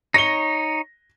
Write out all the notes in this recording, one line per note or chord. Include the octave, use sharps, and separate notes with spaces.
D#4 C#5 A#6 G7